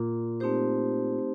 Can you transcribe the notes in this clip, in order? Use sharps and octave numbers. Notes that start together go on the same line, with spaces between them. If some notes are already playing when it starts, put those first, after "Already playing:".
Already playing: A#2
A3 C4 D#4 G4 C5